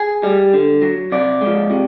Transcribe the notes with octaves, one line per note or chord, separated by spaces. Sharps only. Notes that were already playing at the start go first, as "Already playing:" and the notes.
Already playing: G#4
G3
D3
F#3
C3 D5
G#3
F3
C3